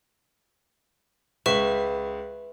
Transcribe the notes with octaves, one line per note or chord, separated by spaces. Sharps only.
C#2 B4 E5 C#6 E7